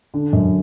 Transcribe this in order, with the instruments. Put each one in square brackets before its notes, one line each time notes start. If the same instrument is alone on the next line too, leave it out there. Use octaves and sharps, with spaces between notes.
[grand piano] D3
F#2